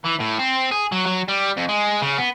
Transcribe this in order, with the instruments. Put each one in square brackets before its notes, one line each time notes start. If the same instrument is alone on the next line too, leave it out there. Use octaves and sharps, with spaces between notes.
[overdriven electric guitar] E3
A2
C4
G#4
F#3
F#3
G3
F2
G#3
C#3
B3